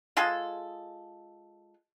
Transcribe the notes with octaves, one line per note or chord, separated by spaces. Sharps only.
G#3 F4 G#4 A4